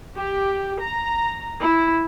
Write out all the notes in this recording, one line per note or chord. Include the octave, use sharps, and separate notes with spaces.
G4
A#5
E4